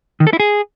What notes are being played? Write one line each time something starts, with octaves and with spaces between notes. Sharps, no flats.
D#3
A4
E4
G#4